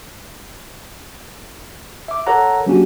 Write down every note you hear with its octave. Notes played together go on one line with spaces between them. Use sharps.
E5 D6
A4 A#4 C#5 F#5 A#5
F#3 A#3 C#4 D4 F#4 G4